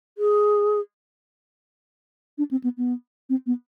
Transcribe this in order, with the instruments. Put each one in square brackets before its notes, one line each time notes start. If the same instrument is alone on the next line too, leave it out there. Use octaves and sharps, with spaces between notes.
[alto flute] G#4
D4
C4
B3
B3
C4
B3